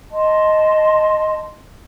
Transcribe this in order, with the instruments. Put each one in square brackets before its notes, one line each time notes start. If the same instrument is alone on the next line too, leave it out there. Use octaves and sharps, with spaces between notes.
[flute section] D#5 A5 C6